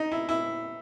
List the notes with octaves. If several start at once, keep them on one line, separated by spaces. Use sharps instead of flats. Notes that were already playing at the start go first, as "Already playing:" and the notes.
Already playing: D#4
E4
E4